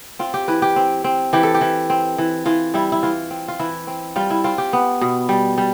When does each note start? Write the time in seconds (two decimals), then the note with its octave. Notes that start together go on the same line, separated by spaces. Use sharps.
0.19 C4 F4
0.34 G4
0.48 E3 B4
0.62 G4
0.76 C4
1.04 C4
1.33 E3 G4
1.43 A4
1.54 G4
1.61 E3
1.90 C4
2.18 E3
2.46 E3 F4
2.74 G3 E4
2.92 E4
3.03 E3 F4
3.30 C4
3.48 F4
3.59 E3 E4
3.87 C4
4.16 G3 F4
4.30 E4
4.44 C4 F4
4.58 G4
4.73 B3
5.01 B2
5.29 G3
5.58 G3